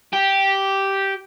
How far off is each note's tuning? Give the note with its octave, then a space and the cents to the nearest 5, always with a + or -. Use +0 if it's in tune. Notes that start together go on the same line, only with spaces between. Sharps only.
G4 -5